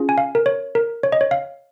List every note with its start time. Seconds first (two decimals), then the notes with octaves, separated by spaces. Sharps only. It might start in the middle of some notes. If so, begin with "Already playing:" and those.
Already playing: C#4 F4 G#4
0.09 G#5
0.18 F5
0.35 A#4
0.46 C#5
0.75 A#4
1.03 C#5
1.12 D#5
1.21 C#5
1.31 F5